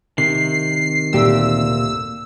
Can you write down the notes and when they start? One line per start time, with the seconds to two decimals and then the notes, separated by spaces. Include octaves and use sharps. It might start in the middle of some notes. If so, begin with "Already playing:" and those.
0.18 C3 D#3 C7
1.13 D2 A#2 G4 E6